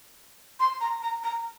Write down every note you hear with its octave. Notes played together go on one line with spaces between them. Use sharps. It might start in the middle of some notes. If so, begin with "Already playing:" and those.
C6
A#5
A#5
A#5